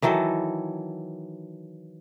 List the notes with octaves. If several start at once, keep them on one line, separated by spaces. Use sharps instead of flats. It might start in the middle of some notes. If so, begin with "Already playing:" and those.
D#3 E3 F#3 A4